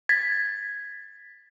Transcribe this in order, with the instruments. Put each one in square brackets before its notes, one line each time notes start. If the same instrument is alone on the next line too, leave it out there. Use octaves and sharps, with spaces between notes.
[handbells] G#6 A6 B6